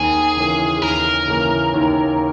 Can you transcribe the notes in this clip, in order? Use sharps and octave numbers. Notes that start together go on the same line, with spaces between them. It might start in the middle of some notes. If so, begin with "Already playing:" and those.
Already playing: D#2 G#4
C#3 E3 A#3
D#2 A#4
C#3 E3 A#3
D#2